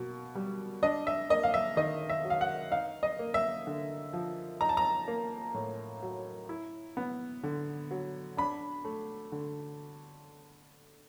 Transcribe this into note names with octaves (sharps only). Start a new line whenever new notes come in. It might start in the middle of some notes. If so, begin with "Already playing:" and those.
Already playing: B2 A#3
G3
D4 D#5
E5
A#3 D#5
F5
E5
D#3 D#5
E5
F#3
F5
F#5
D#4 F5
D#5
A#3
E5
D3
F3
D#4 A#5
A5
A#5
A#3
A2
F#3
E4
B3
D3
F#3
D4 B5
A3
D3